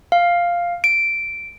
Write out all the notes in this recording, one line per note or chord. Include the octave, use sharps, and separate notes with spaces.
F5
D7